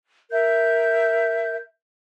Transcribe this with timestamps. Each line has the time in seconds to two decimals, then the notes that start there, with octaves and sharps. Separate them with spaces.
0.31 A#4 E5 G6